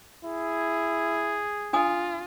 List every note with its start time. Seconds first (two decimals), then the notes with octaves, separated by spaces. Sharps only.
0.24 E4 G#4
1.73 D4 F4 G#5 D#6